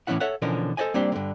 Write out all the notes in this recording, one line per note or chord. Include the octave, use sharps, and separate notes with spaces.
A2 E3 B3 C#4 E4 F#5
A4 C#5 E5 F#5
B2 D3 E3 F3 C#4 A#4
A4 C5 D5 D#5 G#5
G3 A#3 C4 D4 G4
G2 D3